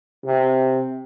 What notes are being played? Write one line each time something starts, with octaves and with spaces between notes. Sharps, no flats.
C3